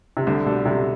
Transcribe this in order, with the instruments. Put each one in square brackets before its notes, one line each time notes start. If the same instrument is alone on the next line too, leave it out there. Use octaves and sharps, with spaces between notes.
[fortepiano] C3
[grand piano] C2 [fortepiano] D3
[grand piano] B2 G3 D4 A4
[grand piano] C2 [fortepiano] C3